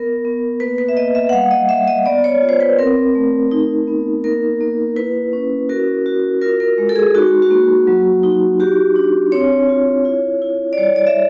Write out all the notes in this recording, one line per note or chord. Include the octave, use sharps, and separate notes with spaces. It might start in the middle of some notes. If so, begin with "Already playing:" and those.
Already playing: B3 A#4
B3
A#3 B4
B4
E5
A#3 D#5
E5
F#5
G3 F5
D#5
G3 E5
D#5
B3 D5
C#5
F4
C5
B4
C4 A#4
A3
D#4
B3
A#3 A#4
A#3
E4 B4
C#4
F#4 A#4
F#4
F4 A#4
A#4
G#3
A4
G#4
D#4 F#4
F#4
A#3
F#3
D#4
F#4 G4
D4
C4 C#5
F4
E4
E4
D5
G3 C#5
D5
E5